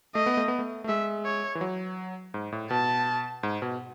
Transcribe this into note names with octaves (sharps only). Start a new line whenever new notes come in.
A3 D#5
B3
A3
B3
A3
A3
G#3 E5
C#5
E3
F#3
G#2
A2
B2 A5
G#2
B2